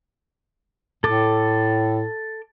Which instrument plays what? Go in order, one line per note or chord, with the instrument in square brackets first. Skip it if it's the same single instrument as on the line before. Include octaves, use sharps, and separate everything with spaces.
[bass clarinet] A2 [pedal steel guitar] A4 D6